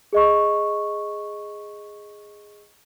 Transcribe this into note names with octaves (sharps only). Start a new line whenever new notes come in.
G#4 D#5 C#6